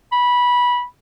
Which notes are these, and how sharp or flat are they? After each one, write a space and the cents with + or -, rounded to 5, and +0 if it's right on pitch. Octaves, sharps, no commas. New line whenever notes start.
B5 -15